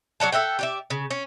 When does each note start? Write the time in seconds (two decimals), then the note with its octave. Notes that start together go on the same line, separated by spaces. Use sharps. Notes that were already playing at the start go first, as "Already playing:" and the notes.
0.20 F#3 D5 F#5 A5
0.32 A4 E5 F#5 G5
0.59 G4 D5 E5
0.90 C#3
1.11 C#4